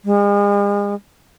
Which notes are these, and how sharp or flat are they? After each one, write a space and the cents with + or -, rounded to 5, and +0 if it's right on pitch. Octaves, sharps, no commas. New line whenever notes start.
G#3 -40